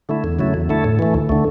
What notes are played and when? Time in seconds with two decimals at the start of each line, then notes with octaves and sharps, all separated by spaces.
0.09 D3 A3 E4
0.24 E2
0.39 C#3 F#3 A3 E4
0.54 E2
0.69 D3 A3 E4 A4
0.84 A2
0.99 E3 A3
1.14 D2
1.29 D3 A3